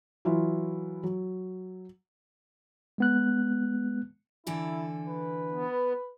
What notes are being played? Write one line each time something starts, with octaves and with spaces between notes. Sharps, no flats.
E3 F#3 E4 F4
F#3
G#3 B3 F#6
D3 E3 E4 A4
B4
B3